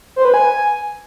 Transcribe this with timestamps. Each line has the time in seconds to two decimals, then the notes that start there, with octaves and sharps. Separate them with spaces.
0.16 C5
0.25 B4
0.34 G#5